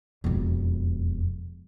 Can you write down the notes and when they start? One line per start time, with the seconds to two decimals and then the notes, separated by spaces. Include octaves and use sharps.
0.24 E1 F2